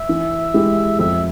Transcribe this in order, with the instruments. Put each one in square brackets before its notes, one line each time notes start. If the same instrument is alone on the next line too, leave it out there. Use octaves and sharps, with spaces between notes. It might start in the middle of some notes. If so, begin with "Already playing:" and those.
Already playing: [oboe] E5
[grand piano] E3
G#3 E4 G4
[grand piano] F2 [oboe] E5